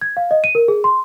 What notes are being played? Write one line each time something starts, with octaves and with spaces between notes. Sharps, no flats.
G#6
F5
D#5
D#7
A#4
G#4
C6